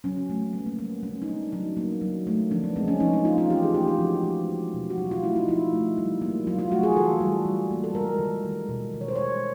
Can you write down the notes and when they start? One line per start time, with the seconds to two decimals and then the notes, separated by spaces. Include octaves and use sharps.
0.04 F#3 C#4
0.30 A3
0.53 G3 B3
0.66 A#3
0.78 A#3 B3
1.03 G3 C#4
1.22 D#4
1.27 A#3 D4
1.52 F#3 D#4
1.77 A#3
2.01 F#3
2.27 A3
2.51 F3 D4
2.64 B3
2.76 G#3 C4
2.88 C#4
3.00 F3 D#4
3.13 D#4
3.25 A#3 F4
3.38 F4
3.50 E3 G4
3.63 G#4
3.74 A3 G4
3.87 G4
3.99 F3 F#4
4.24 G#3
4.49 G#3
4.74 B2
4.90 F#4
4.98 F#3 F4
5.11 F4
5.23 A3 E4
5.36 D#4
5.48 F3 E4
5.73 A3
5.98 G3
6.22 A#3
6.47 F#3 F4
6.59 F4
6.71 A3 F#4
6.83 G#4
6.96 E3 A4
7.21 G3
7.45 G3
7.71 A#3
7.84 A4
7.95 G#3 A#4
8.19 D#3
8.45 G#3
8.69 B2
8.94 D#3
9.01 C#5
9.08 C5
9.16 G#3 C#5